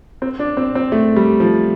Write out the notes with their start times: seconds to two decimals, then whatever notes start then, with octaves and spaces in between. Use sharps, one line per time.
0.22 C4
0.39 D4
0.57 C4
0.75 C4
0.92 A3
1.16 G3
1.40 F3